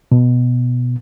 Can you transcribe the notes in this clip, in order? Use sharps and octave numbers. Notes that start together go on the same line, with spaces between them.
B2